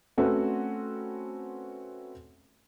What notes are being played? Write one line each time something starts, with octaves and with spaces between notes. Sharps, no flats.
A3 C4 C#4 F#4 A4 B4